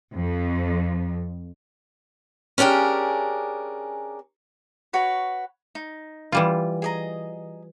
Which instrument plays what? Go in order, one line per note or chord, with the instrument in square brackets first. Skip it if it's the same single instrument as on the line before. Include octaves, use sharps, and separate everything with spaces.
[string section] F2
[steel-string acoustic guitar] C#4 D4 G4 G#4 A#4
[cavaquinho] F#4 B4 C#5
D#4
[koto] E3 G3 F4
[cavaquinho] G#4 D#5 A#5